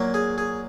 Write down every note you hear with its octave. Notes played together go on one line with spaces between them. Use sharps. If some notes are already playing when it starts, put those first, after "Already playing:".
Already playing: A#2 F#3 A#3
G#4
G#4